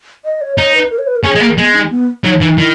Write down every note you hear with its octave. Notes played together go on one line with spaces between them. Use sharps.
D#5
C#5
D#4 C#5
B4
A#4
C#5
B4
A#4
C#4 G#4
G#3
A#3
G#3 B3
D#4
B3
F#3 D#4
E3 D#4
D#3 E4